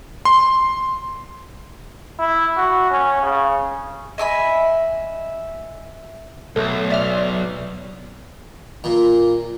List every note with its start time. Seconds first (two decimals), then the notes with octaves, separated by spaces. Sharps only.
0.25 C6
2.19 E4
2.57 F#4
2.91 C#4
3.22 C#3
4.18 D#5 E5 G#5 B5
6.56 B1 A3
6.90 D5 E5 F6
8.84 A#2